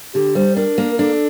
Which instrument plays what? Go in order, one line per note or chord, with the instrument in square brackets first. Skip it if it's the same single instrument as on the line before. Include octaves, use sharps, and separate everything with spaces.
[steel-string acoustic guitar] D3 [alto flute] G4
[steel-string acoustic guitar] G3 [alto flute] C5
[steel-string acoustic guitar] D4 [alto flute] A#4
[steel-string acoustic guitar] A#3
[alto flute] A#4
[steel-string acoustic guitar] D4 [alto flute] A4